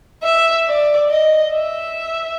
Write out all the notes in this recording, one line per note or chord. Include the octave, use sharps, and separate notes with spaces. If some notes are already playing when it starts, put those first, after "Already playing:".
E5
D5
D#5
E5